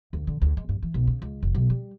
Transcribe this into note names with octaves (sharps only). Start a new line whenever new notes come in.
D2
D3
D2
G#3
G2
E3
B1
C#3
C#2
F1
B1
G3